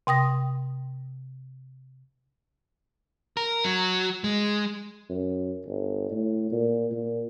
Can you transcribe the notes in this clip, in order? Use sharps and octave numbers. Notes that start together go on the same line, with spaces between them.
C3 G5 D#6 A#6
A#4
F#3
G#3
F#2
G1
A2
A#2
A#2